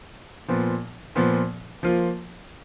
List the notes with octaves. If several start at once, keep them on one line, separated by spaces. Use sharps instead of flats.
A#2 F3 B3
A#2 F3 B3
F3 A#3 F4